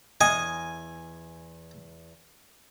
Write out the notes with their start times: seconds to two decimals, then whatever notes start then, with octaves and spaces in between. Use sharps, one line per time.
0.21 E2 D#5 G#5